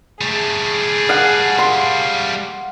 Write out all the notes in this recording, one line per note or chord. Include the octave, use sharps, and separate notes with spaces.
G3 A3 G#4
F5 F#5
C6